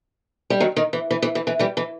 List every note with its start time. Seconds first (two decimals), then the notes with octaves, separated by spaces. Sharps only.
0.50 G3
0.60 D#3 F#3
0.76 D#3
0.93 E3
1.11 E3
1.22 E3
1.35 E3
1.47 E3
1.59 E3 G3
1.77 E3